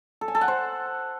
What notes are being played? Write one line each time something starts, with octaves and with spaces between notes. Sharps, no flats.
A4
G#5
A4
F#5
C5